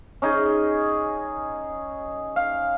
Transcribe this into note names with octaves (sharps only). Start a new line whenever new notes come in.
C#4 D#4 G#4
F5